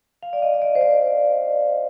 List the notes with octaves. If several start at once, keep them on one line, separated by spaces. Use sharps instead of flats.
F5
D5
D#5
D#5
D5
C5
D5